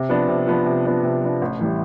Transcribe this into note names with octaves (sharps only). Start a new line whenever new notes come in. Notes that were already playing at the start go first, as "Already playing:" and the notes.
Already playing: C3
F3 B3 D4
C3
F3 B3 D4
C3
F3 B3 D4
C3
F3 B3 D4
A1
A2 E3 G3